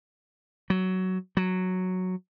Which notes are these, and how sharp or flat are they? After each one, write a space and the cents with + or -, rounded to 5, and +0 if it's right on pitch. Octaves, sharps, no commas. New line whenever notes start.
F#3 +10
F#3 -5